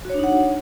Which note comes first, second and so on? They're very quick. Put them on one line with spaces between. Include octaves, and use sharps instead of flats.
F#4 C#5 D4 D#4 F#5